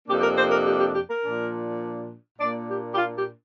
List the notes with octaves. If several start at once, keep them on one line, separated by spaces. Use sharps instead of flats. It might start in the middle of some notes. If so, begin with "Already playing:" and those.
F2 C3 A#3 D4 G4
G4
A#4
C5
A#4
G4
G4
G4
A#4
A#2 F3 D4
A#2 A#3 D4 D5
G4
G4
F4
G4